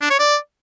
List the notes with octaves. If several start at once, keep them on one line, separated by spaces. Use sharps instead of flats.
D4
C#5
D5